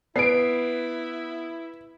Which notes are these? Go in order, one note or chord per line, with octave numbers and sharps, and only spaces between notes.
B3 E4 B4 C7 D7